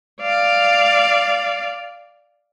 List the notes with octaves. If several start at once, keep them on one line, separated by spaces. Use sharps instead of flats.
D5 F5